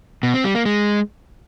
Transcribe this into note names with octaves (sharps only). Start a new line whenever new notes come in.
B2
C4
G3
A#3
G#3